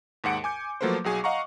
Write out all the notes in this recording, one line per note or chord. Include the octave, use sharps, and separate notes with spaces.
D#2 G#2 F#5 C#7 D7
G#5 D6 G6
F3 F#3 A3 A#3 B4 C5
B1 F#3 G#4 G#5 C#6
D#5 F5 F#5 A#5 C#6